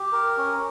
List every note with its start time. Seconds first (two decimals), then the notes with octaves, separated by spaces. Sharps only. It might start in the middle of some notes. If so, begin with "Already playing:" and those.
Already playing: G4
0.12 A#4
0.38 C#4